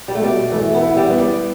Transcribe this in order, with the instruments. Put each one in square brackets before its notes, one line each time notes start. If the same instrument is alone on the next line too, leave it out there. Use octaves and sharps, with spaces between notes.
[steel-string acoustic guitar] G3
A3
[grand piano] B2 [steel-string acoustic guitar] G3
[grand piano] E3 [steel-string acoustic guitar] A3
[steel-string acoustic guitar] B3
[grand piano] E4
[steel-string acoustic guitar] G3
[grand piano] B3
[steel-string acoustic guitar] G3